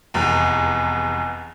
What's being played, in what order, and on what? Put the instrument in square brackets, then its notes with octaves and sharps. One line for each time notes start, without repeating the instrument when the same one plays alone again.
[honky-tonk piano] F1 E2